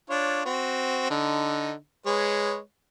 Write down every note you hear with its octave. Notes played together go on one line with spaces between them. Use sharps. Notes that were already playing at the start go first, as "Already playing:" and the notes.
D4 F4 C#5
C4 F#4
D3 D#4
G#3 B4 C#5